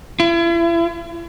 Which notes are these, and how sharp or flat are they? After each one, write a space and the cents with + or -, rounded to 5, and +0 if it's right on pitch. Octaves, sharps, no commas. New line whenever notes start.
E4 +40